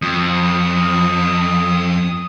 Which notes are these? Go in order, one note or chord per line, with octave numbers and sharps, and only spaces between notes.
F2 D#6